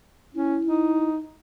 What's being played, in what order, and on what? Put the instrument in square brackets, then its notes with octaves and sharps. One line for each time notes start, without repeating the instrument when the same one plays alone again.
[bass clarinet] C#4 [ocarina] E4
[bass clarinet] D#4